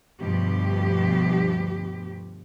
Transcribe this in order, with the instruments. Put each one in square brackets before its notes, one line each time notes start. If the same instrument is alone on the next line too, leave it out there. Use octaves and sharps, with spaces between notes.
[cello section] D2 G2 B2 F3 G4